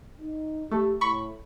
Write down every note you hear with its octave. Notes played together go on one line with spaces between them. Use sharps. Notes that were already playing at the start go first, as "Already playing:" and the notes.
D#4
A3 G4
A2 B5 C#6